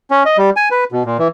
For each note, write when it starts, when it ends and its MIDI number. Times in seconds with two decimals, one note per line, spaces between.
0.11 0.23 61
0.25 0.37 75
0.38 0.50 55
0.56 0.69 80
0.71 0.84 71
0.92 1.03 47
1.06 1.17 46
1.19 1.28 52